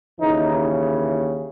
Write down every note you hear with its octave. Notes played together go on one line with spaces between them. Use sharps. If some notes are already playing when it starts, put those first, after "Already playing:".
D#2 C#3 E3 D#4